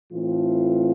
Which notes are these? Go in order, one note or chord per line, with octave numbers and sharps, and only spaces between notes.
A2 E3 A3 C4 F4